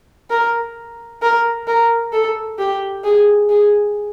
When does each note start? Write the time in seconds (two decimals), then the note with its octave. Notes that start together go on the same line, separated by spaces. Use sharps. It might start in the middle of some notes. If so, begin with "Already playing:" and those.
0.30 A#4
1.22 A#4
1.67 A#4
2.13 A4
2.59 G4
3.04 G#4
3.50 G#4